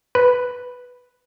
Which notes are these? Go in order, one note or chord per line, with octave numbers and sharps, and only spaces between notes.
B4